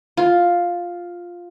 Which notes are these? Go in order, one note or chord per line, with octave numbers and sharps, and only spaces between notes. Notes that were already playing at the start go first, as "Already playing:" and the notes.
F4